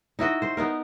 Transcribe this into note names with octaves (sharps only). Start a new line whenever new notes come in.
D#4 E4 F#4 D#5
C5
B3 D#4 A#4